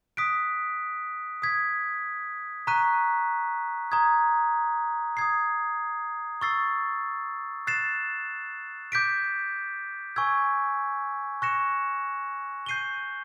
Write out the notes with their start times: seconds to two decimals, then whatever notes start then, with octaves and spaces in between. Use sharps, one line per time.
0.17 D#6 F#6 B6 D7
1.42 D#6 G#6 B6
2.67 A#5 C#6 F#6 B6 D#7
3.92 A#5 D#6 G#6
5.17 D#6 G#6 C7
6.41 C#6 E6 A6 C7
7.67 F#6 A6 C7 E7
8.92 D6 G6 B6 D7
10.16 G#5 C#6 E6 G#6
11.42 C#6 F#6 A#6 C#7 E7
12.66 G6 C7 D#7 G7